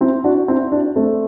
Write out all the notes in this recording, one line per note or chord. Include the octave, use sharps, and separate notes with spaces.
C4 E4
D4 F#4
C4 E4
D4 F#4
A3 C4